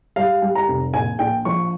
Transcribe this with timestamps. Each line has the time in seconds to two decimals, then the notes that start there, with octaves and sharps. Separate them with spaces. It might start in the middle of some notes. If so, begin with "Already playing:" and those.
0.16 G3 F5
0.42 G3
0.55 A#5
0.68 F1
0.94 A#1 G#5
1.19 A#1 G5
1.45 F3 C#6